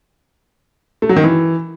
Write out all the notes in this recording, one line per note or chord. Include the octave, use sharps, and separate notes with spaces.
A3
F#3
D#3
E3